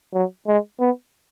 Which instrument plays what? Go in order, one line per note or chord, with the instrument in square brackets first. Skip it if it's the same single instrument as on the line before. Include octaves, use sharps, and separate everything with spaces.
[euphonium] F#3
G#3
B3